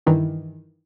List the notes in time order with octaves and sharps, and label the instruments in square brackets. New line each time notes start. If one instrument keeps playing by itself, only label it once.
[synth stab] G2 D#3 E3